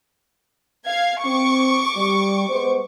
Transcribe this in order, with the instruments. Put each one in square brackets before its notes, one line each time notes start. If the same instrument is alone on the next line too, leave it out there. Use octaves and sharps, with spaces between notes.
[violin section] F5 G#6
[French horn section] C4 [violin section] C#6 D6
[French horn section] G3
G#3 B3 C5